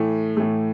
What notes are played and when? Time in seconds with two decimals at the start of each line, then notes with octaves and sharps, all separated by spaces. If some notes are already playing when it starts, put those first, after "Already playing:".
Already playing: A2 E3 A3
0.37 A2 E3 A3